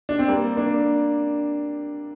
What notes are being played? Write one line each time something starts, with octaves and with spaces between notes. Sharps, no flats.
D4
C4
G3 A#3
A#3 D4